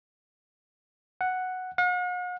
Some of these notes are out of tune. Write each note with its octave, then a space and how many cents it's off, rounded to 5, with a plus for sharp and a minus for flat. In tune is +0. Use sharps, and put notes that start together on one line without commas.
F#5 +0
F#5 -45